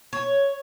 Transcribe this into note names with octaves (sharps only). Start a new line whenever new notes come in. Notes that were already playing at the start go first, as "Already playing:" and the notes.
C#5